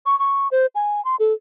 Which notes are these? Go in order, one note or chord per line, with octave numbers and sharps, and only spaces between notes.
C#6
C#6
C5
G#5
C6
A4